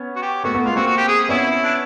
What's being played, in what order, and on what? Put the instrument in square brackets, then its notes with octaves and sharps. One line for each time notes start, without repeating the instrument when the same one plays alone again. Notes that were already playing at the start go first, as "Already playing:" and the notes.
Already playing: [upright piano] B3 C#4
[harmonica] F#4
G4
[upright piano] A3 B3 [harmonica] F#4
[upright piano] A3 B3
[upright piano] G#3 A#3 [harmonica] F4
[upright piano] A#3 C4 [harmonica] F#4
[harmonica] F#4
G4
G#4
[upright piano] B3 C#4 [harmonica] E4
[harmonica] E4
D4